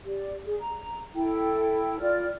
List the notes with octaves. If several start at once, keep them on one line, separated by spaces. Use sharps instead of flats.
G4 D5
G#4
A#5
E4 A4 G5
F4 D5 F6